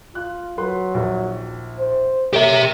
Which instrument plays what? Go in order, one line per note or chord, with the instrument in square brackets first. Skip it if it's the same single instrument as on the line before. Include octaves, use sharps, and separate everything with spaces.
[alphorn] F4 [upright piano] F#6
[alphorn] F#3 [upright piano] B4 C6
[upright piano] A#1 D#2
[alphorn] C5
[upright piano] A#3 [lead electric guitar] G4 E5 [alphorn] C#5